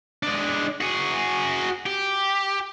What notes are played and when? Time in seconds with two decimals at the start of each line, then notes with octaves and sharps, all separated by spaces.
0.23 G#3 D4
0.81 F#4 G#4
1.86 G4